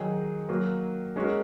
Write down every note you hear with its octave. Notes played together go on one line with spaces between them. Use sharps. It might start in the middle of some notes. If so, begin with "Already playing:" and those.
Already playing: D#3 F#3 D#4 G#4
F#3 A#3 F#4
G#3 C#4 F#4 A#4